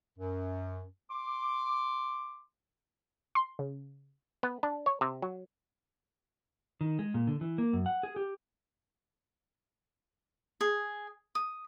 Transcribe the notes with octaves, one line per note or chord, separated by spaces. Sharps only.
F#2
C6 D6
C6
C#3
B3
D4
C#5
C3
F#3
D#3
G#3
A#2
D3
E3
A#3
F#2
F#5
G#4
G4
G#4
D#6